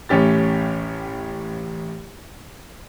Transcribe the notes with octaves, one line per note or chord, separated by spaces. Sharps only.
A1 A2 C#4 G4 A6